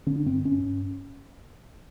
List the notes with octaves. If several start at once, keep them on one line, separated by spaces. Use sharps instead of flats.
D3 C#4
D4
G2 C4
G2 C#4
G2